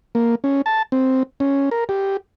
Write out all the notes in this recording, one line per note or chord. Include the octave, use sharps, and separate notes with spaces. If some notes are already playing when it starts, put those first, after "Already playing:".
A#3
C#4
A5
C4
C#4
A#4
G4